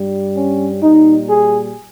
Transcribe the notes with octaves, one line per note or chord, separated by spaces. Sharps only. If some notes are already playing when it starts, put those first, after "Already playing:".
Already playing: G2 G3
C#4
A#2 G3 D#4
G#4